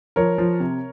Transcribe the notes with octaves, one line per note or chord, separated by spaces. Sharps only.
F3 A#4 C#5
F3
C3